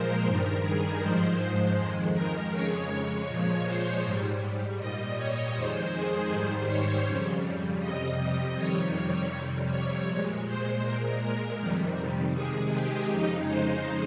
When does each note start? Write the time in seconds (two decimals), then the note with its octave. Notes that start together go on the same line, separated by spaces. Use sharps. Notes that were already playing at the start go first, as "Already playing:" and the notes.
Already playing: A#2 F3 G#3 A#4 C5
0.25 G2 D#3 G3 A#4
0.63 G#4
1.01 G#2 F3 G#3 C5
1.77 F2 D#3 G#3
2.14 A#4
2.52 F2 C#3 G#3 C#5
3.27 A#2 F3 G#3 C#5
3.65 C5
4.03 G#2 G3
4.78 A#2 G3 D#5
5.17 C#5
5.54 F2 D#3 G#3 C5
5.93 G#4
6.30 G#2 D#3 G3 C5
6.68 C#5
7.05 F2 C#3 G3
7.81 F2 C3 G3 D#5
8.57 F2 C3 D#3 G3 C#5
9.33 F2 C3 G3
9.71 C#5
10.09 A#2 G#3
10.47 C5
10.84 A#2 G#3 A#4
11.21 A#4
11.59 F2 C3 D#3 G3
12.35 C3 D#3 G#3 G#4
12.73 G4
13.11 F2 C#3 G#3 D#4
13.48 C5